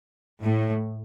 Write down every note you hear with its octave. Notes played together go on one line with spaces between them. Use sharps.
A2